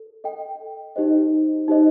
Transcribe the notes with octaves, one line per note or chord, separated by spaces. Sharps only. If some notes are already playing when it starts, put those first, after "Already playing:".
Already playing: A4
A4 D#5 G5
D#4 G4 C5 D#5
D#4 G4 C5 D#5